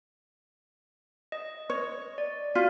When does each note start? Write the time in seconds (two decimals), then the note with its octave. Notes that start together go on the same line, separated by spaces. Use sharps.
1.32 D#5
1.70 C#5
2.18 D5
2.55 F4 F#4